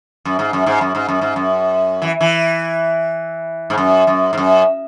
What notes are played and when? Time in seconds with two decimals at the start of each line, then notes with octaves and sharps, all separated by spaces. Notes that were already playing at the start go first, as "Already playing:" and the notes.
0.25 F#2
0.39 G#2
0.53 F#2
0.66 G#2
0.81 F#2
0.95 G#2
1.09 F#2
1.21 G#2
1.36 F#2
2.02 E3
2.21 E3
3.70 G#2
3.78 F#2
4.07 F#2
4.33 G#2
4.38 F#2